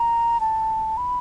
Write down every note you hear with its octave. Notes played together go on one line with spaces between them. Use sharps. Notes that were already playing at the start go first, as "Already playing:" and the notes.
Already playing: A#5
A5
B5